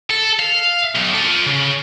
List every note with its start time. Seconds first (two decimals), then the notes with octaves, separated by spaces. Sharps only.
0.10 A4
0.39 F5
0.95 B1
1.14 F4 A4
1.46 C#3